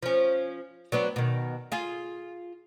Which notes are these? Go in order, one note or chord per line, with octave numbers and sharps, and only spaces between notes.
F3 C#4
F#3 B3 D4
B2 D#3
F4 G#4